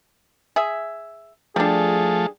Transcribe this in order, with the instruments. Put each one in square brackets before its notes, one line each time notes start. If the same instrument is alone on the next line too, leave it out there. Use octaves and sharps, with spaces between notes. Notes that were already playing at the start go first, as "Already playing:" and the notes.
[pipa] G#4 E5
[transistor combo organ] F3 A3 [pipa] G3 D4 [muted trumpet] G#4